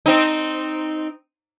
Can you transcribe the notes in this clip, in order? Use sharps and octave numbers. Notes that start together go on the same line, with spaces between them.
C4 D#4